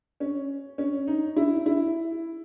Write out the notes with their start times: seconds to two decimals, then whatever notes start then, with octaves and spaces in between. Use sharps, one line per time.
0.20 C#4
0.78 C#4
1.07 D#4
1.36 E4
1.66 E4